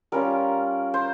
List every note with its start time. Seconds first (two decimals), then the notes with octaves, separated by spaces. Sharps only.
0.12 G3 C#4 F4 A#4
0.94 C5